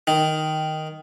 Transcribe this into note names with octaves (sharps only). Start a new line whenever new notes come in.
D#3